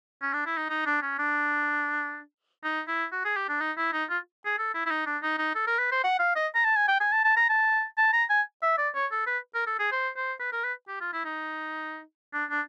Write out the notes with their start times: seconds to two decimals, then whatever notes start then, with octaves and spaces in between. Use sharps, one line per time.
0.22 C#4
0.33 D4
0.46 E4
0.57 D#4
0.70 D#4
0.86 D4
1.02 C#4
1.19 D4
2.64 D#4
2.88 E4
3.12 F#4
3.25 G#4
3.36 G4
3.49 D4
3.60 D#4
3.77 E4
3.93 D#4
4.09 F4
4.45 G#4
4.58 A4
4.74 E4
4.86 E4
4.91 D#4
5.06 D4
5.23 D#4
5.39 D#4
5.55 A4
5.67 A#4
5.79 B4
5.91 C5
6.04 F#5
6.19 F5
6.36 D#5
6.55 A#5
6.65 A5
6.76 G#5
6.88 G5
7.00 G#5
7.12 A5
7.24 A5
7.36 A#5
7.49 A5
7.98 A5
8.13 A#5
8.30 G#5
8.62 E5
8.78 D5
8.95 C#5
9.11 A4
9.27 B4
9.54 A#4
9.67 A4
9.79 G#4
9.92 C5
10.16 C5
10.40 B4
10.52 A#4
10.64 B4
10.88 G4
11.00 F4
11.13 E4
11.25 D#4
12.33 D4
12.50 D4